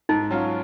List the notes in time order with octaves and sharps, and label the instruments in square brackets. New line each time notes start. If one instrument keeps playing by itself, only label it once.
[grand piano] G#2 [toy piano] D#4
[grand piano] F#3 C#4 F4